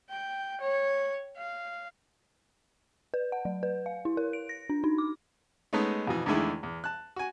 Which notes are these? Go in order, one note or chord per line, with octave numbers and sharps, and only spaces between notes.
G5
C#5
F5
B4
F#5
F#3
B4
F5
E4
A#4
D7
A#6
D4
D#4
D6
G#3 A3 B3 C#4 D#4
F2 B2 E3
E2 D3 D#3 G#3 A3 E4
E2
A5 F#6
F#4 G#5